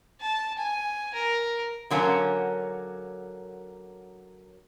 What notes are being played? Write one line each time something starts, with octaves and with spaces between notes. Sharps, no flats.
A5
G#5
A#4
D3 F#3 A#3 C#4